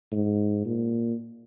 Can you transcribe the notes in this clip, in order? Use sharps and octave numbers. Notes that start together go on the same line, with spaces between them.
G#2
A#2